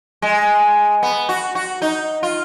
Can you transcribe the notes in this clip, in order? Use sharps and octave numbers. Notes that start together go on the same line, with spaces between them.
G#3
B3
F#4
F#4
D#4
F4